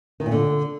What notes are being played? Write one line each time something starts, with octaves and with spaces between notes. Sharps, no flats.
D#3
A#2
D3